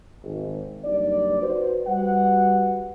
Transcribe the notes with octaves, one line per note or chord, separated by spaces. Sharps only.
G#1
F#1 G2 D#4 D5
F#4 B4 C5
G3 F#4 B4 F#5